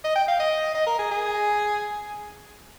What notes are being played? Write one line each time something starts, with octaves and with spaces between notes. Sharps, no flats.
D#5
G5
F5
D#5
D#5
A#4
G#4
G#4